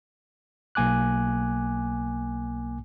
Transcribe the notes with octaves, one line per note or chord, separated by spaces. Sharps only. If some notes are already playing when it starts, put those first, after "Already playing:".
B1 A#3 G#5 D6 F#6